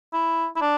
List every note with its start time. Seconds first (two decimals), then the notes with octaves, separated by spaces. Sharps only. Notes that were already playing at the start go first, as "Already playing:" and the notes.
0.13 E4
0.56 E4
0.61 D4